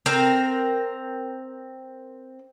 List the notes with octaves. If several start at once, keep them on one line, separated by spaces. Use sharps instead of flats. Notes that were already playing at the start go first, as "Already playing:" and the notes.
C4 A#4